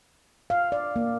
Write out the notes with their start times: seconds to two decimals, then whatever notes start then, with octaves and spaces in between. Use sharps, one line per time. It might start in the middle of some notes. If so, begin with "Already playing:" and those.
0.50 F5
0.72 D5
0.96 A#3